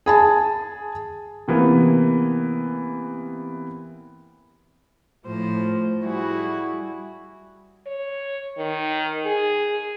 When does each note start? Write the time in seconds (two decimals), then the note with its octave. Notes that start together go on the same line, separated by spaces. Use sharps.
0.06 G#4 G#5 A5
1.48 C3 E3 A#3 B3
5.27 A2 F3 C5
6.04 G3 E4 F#4 G#4
7.87 C#5
8.58 D#3
9.26 G#4